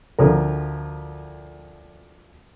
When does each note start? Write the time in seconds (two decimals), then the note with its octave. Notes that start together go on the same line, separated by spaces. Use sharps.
0.19 D2 F3 A#4